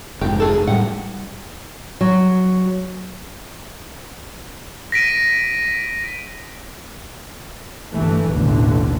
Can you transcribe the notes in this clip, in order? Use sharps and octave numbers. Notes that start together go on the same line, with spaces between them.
F1 G#2 G4
G#4 A4
A2 G3 F#5
F#3
A#6 B6 D7 D#7
G1 G2 E3 A3
A1 D#2 B2 D3 E3